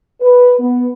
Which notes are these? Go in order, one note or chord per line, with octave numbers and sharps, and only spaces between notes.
B4
B3